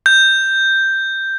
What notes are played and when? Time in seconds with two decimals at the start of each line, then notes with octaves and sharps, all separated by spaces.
0.06 G6